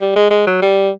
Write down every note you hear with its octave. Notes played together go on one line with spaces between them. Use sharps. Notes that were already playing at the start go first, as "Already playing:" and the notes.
G3
G#3
G#3
F#3
G3